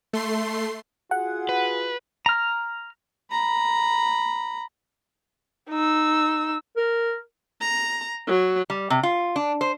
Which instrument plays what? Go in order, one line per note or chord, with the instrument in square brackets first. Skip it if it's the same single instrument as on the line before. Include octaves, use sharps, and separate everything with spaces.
[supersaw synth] A3 C6 C7
[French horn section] F4 F#4 G#4 [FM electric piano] F#5
[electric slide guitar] B4
[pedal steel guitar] A#5 F6
[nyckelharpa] A#5 B5
[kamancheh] D#4 E6
[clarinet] A#4
[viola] A#5
F#3
[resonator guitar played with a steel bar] G3
C3
F4
D4
C5